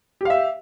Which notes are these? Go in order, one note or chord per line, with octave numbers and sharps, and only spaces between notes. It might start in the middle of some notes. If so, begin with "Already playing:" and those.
G4 E5 F5